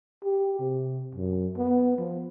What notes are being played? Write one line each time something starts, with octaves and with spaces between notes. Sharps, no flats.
G4
C3
F#2
B3
F3